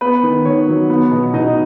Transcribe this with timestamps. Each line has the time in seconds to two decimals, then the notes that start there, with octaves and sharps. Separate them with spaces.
0.01 B3 B4
0.23 D#3
0.45 D#3 C#5
0.68 F#3
0.90 B3
1.11 B2
1.34 B2 D#4 D#5